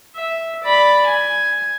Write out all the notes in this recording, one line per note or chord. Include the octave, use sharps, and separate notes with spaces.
E5
D5 B5
G#5